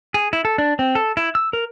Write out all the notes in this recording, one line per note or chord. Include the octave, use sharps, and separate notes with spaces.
G#4
E4
A4
D4
C4
A4
E4
E6
A#4